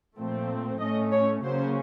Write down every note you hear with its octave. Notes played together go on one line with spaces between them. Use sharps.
A#2 F3 A3 C4
A2 A3 C#4 D#5
C#5
C#3 F#3 A#3 C#4 C5